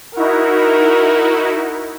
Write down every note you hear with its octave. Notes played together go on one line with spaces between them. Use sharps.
D#4 E4 F#4 A#4